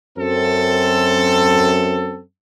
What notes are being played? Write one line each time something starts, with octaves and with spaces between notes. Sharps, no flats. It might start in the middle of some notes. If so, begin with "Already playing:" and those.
F#2 C4 A4